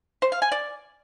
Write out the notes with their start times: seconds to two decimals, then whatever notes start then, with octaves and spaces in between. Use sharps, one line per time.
0.22 C5
0.32 F5
0.42 G#5
0.52 D5